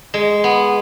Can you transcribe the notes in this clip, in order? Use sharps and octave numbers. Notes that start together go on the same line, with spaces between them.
G#3
B3